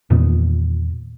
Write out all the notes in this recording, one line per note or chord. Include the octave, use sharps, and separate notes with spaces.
E2 A#2 D#3 B3